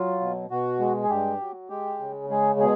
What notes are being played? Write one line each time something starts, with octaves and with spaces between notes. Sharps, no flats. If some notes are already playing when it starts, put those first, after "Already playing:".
Already playing: F#3 F4
B2
B2 F#4
G#3
G#4
G2 G4
F#3
G#3 G4
C#3
G#3 G#4
B2 G#4